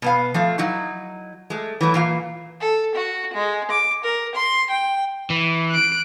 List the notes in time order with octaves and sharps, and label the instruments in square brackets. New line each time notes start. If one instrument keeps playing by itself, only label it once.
[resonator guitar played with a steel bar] B2 B3 F5
F3 A3 F5
F#3 D#4 E4
G#3 A3
E3 F#3 A3
A#2 E3 F5
[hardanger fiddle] A4
F#4
G#3
D6
A#4
C6
G5
[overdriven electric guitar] E3
[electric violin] F#6 D7